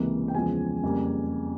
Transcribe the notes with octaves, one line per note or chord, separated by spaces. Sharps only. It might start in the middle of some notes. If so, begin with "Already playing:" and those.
Already playing: C#2 C3 E3 A#3
G5
E2 C#3 F3 G#3 G#5
F2 C#3 G3 A#3